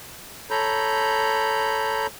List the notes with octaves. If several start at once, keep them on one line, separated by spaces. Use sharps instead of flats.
A4 C#5 A#5 B5 G6